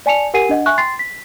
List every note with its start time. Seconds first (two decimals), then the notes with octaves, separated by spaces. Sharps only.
0.06 D5 G#5 A5 C#7 F7
0.34 G4 A#4 F#5 G#5 C7 D#7
0.49 D4 D#5 F#5
0.66 E5 G#5 C#6 F#6
0.78 G5 C6 A6 C7
0.99 B6